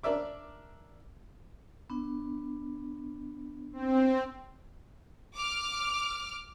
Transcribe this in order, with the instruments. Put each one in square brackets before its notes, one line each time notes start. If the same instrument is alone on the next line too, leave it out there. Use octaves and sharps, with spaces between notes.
[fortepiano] D4 A#4 D5 E5 D6
[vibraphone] B3 D4
[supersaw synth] C4
[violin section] D6 F6